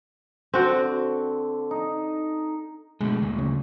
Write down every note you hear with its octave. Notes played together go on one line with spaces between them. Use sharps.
D3 C4 F#4
D#4
B2 D3 G#3 A3
D2 A#2
C#3